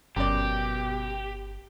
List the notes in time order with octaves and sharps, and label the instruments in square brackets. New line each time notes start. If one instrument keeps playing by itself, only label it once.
[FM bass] G1 [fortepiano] F#2 D5 [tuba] B2 [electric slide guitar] G4